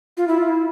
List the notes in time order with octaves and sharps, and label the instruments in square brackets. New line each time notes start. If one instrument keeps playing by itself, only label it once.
[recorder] F4
E4
F4
E4